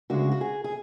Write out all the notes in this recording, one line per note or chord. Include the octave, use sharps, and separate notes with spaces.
D2 C#3 G#3 D4 F#4
F#4
G#4
G#4